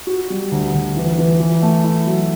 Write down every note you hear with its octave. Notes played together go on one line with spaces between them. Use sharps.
F#4
G3
D2
D2
E3
E3
E3
A3
E4
F#3